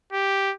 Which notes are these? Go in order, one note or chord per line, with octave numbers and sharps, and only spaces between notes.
G4